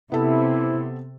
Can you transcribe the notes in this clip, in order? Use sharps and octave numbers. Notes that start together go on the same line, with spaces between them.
C3 B3 C4 E4 A4